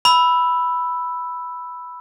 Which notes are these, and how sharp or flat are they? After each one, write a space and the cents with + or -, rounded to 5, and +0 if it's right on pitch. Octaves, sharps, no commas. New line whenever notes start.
B5 +0 E6 +0